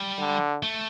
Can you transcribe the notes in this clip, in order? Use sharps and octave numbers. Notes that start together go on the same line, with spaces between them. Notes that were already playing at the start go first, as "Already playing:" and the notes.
Already playing: G3
D3
A3